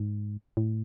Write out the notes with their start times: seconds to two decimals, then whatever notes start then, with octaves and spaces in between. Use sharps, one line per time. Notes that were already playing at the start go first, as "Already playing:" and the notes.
Already playing: G#2
0.57 A2